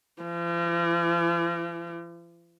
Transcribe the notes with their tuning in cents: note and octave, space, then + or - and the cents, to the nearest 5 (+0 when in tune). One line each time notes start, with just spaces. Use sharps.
F3 -45